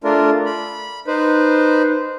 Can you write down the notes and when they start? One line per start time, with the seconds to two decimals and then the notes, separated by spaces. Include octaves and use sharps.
0.04 A3 D4 F4 A#4
0.46 B5
1.07 D#4 B4 C5